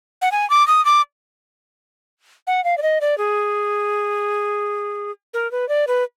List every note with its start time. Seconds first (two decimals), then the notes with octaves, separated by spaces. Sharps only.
0.22 F#5
0.32 G#5
0.50 D6
0.67 D#6
0.85 D6
2.47 F#5
2.64 F5
2.78 D5
2.82 D#5
3.01 D5
3.18 G#4
5.34 A#4
5.51 B4
5.69 D5
5.87 B4